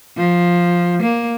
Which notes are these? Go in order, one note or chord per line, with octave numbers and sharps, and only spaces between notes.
F3
A#3